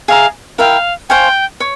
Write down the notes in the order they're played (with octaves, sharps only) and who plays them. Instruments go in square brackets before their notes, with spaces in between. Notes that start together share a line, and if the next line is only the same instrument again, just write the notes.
[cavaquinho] G#4 E5 A#5 [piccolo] F5
[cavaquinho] E4 A#4 E5 G5 [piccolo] F5
[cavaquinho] C5 F5 G#5 C#6 [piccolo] G5
[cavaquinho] C#5